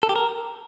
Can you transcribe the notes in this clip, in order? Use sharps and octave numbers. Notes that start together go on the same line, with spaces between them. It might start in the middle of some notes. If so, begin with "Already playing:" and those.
A4
G4
A#4